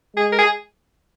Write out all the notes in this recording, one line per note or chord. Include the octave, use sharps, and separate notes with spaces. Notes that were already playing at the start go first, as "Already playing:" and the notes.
G#3 G#4
A#4
G#4